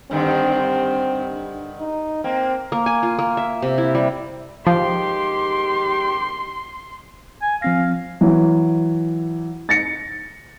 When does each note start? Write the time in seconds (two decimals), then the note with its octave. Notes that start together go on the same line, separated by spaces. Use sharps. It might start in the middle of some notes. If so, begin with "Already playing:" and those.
0.11 G2 D3 D#3 C4
1.80 D#4
2.24 A#3 C4
2.72 A#3
2.86 G#5
3.03 F4
3.19 A#3
3.37 E5
3.62 C3
3.78 E4
3.95 G3
4.67 G#2 D#3 F3 G4 C6
7.42 G#5
7.62 F3 C4 F5 A#6
8.21 E3 F#3
9.69 A6 A#6 C#7